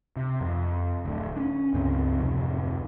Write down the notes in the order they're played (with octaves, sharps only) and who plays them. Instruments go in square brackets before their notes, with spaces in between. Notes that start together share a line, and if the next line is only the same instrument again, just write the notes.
[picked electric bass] C3
F2
D1 D2
C#4 D4
C#2 G2 C#3 C4
D1 F2 C3